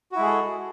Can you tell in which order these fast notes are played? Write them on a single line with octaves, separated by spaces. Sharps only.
F#4 E4 G#3 G#4 A4